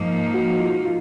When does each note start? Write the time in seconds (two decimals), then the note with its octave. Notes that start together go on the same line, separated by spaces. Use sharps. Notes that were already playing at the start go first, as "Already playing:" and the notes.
Already playing: G#2 F3 A#3 D#4
0.34 F#4
0.60 F4
0.85 F4